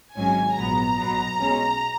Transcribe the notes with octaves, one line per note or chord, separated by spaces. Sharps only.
G#1 G#2 F#3 C#4 G#5
A#1 G#2 F#3 B3 A#5
B1 B2 F#3 B3
B1 B2 G#3 C#4